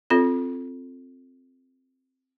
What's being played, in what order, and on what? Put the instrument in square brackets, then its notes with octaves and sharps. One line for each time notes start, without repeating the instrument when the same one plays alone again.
[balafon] C4 F4 A4